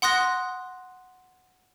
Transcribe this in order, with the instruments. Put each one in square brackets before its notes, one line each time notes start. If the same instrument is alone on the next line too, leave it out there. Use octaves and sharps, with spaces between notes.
[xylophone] F#5 C6 D#6 F#6 A#6